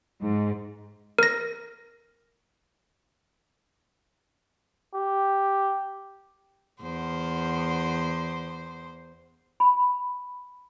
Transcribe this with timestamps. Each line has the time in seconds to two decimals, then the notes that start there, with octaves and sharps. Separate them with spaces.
0.22 G#2
1.19 A#4 A#6
4.94 G4
6.82 E2 C5
9.60 B5